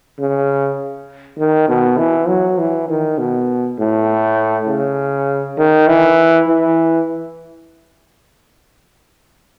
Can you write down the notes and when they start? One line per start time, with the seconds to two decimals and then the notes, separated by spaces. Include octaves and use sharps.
0.19 C#3
1.38 D#3
1.68 B2
1.98 E3
2.28 F#3
2.58 E3
2.89 D#3
3.18 B2
3.79 A2
4.68 C#3
5.58 D#3
5.87 E3
6.47 E3